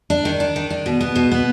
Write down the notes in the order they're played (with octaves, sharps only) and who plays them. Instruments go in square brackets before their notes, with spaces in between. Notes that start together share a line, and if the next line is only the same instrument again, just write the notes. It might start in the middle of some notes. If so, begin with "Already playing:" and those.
[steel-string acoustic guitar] D4
D#3
D4
D#3
D4
B2
B3
B2
B3